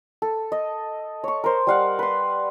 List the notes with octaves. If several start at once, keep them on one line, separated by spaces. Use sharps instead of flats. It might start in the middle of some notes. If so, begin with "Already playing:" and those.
A4
D#5
C#5 C#6
A#4 C5
G3 F5 F#5
B4 C6